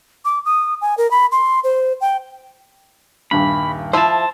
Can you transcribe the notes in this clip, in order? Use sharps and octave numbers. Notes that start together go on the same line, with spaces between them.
D6
D#6
G#5
A#4
B5
C6
C5
G5
D#1 G2 B5
F3 E4 C5 A5